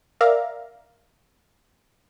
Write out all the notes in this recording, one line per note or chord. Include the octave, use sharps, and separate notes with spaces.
A#4 D5 E5 F5 A#5